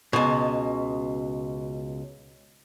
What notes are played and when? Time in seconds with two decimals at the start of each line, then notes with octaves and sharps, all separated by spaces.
0.13 C#2 B2